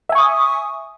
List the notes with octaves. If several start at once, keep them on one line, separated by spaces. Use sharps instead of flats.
E5 G#5 C#6 D#6